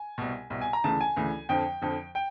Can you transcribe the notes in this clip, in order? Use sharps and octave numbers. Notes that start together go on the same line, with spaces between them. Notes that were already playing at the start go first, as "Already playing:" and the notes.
Already playing: G#5
C2 B2
C2 B2
G#5
A#5
D2 C#3 E3 A5
G#5
D2 C#3 E3
F2 D3 F3 G5
F2 D3 F3
G5